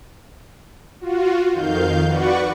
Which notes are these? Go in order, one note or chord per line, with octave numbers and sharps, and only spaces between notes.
F4 F#4
F2 D#3 F5 G6
F#4 B4 D5 F#5 C#6